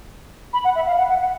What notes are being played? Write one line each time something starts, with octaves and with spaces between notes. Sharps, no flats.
B5
F#5
E5
F5
F#5
F#5
F#5